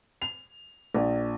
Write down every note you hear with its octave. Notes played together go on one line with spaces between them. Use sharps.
F7
A#1